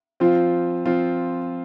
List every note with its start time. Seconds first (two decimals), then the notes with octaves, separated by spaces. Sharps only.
0.20 F3 C4 F4
0.85 F3 C4 F4